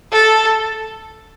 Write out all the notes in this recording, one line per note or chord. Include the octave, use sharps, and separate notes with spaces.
A4